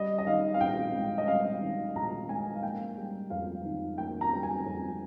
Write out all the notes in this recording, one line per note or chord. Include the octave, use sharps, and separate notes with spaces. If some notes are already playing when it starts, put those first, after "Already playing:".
Already playing: G3 D#5
D#5
D#3 F5
F5
A#1 G5
G#2
D#5
G3 F5
D#3
A#1 A#5
G#2 G#5
F5
A#3 G5
G3
F2 F5
D#3
A#3 G5
A#5
G3
G#5
F2